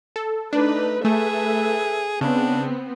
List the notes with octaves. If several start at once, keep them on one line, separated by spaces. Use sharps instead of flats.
A4
A3 D4 D#4 B4
A3 G#4 A4 B4 E5
C#3 B3 C4 D4